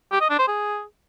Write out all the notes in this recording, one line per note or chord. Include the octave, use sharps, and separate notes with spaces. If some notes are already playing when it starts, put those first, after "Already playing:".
G4
D#5
D4
C5
G#4